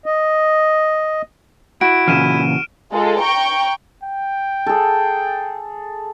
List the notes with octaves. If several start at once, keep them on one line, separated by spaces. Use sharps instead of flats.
D#5
E4 F#4 D7
A#2 C#3 E3 F6 D#7 E7
G#3 F4 A4
G5 A#5 C#6
G5
G#4 A4